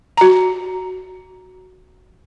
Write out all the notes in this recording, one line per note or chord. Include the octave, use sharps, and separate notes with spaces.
F#4 A#5